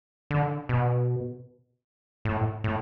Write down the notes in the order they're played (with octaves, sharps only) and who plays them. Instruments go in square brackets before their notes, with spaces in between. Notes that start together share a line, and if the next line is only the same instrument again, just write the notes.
[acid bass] D3
B2
A2
A2